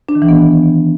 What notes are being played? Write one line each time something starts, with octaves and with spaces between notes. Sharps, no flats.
D4
D#3
E3
B3